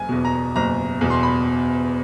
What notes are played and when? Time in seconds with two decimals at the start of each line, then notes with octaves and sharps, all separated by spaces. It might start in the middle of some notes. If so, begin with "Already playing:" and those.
Already playing: F#1 G#5
0.09 E2 B2
0.25 A#5
0.56 F#1 A#5
1.01 E2 B2
1.10 C6
1.23 B5